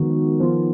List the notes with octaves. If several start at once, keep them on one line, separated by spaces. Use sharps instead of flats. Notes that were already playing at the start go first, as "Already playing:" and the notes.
Already playing: D#3 F3 G#3 B3 D#4 F#4
F3 B3 F4